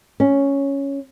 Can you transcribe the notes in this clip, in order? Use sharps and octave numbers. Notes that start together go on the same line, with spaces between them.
C#4